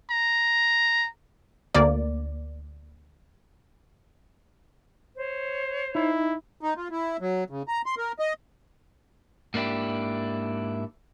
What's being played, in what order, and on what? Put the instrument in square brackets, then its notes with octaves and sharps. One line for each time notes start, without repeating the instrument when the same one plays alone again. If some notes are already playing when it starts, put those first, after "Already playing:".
[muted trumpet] A#5
[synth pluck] D2 A#3 D5
[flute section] C5 C#5
[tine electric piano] D#4 [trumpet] E4
[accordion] D#4
F4
E4
F#3
C#3
A#5
C6
A#4
D#5
[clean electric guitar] G#2 A#3 D4 E4 G4